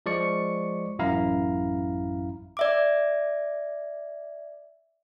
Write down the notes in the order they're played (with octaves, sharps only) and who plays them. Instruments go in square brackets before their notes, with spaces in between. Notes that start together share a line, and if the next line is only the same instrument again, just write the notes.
[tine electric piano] F3 G#3 D5 C#6 C#7
A1 F#2 E4 F5 A#5
[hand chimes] D5 E5 D6